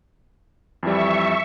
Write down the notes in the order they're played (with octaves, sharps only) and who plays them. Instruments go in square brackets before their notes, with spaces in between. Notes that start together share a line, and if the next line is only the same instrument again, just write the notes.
[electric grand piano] F2 E3 G3 [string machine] E5 C#6